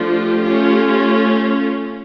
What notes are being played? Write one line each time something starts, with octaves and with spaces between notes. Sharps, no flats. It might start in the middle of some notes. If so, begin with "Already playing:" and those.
Already playing: F3 A3 D4 F4
G4
A3 C#4 F4